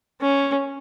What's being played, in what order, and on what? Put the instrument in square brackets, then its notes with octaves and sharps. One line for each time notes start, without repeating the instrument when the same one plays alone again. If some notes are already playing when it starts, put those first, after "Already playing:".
[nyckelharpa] C#4